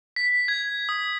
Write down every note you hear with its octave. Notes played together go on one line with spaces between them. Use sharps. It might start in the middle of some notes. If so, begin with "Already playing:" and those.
B6
G#6
D#6